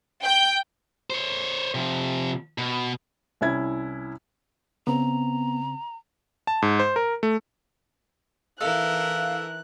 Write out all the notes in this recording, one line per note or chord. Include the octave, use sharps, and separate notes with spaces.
G5
C5 C#5
C3 F3
B2
C2 C#4 E4 G#6
C#3 B3 C4 A#5
A5
G#2
C5
A#4
A3
E3 E4 A4 A#4 F5 F#6